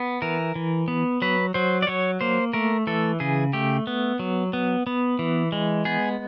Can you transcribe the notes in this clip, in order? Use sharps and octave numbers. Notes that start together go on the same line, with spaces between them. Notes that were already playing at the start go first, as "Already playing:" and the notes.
Already playing: B3
E3 A#4
E3
B3
F#3 B4
F#3 C5
D5
F#3 C#5
A#3 C5
A3 A#4
E3 A4
C#3 G#4
A3 G4
B3
F#3
B3
B3
E3
G#3
B3 G#4